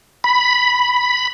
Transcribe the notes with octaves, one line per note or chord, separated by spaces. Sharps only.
B5